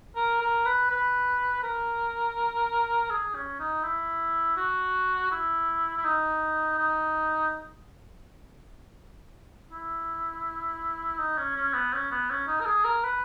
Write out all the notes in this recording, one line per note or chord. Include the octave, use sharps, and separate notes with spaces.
A#4
A#4
B4
B4
A#4
G#4
C#4
D#4
E4
F#4
E4
E4
D#4
D#4
E4
D#4
C#4
C#4
B3
C#4
B3
C#4
D#4
A#4
G#4
A#4
B4